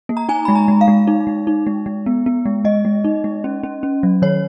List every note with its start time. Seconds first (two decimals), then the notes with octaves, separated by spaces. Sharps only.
0.09 A#3
0.17 A#5
0.29 D#4 G#5
0.45 G#3 B5
0.55 A#5
0.68 G#3
0.81 F5
0.88 G#3
1.07 D#4
1.27 G#3
1.47 D#4
1.67 G#3
1.86 G#3
2.06 B3
2.26 B3
2.46 G#3
2.65 G#3 D#5
2.85 G#3
3.04 D#4
3.24 G#3
3.44 C#4
3.63 C#4
3.83 C#4
4.03 F#3
4.22 D#3 C#5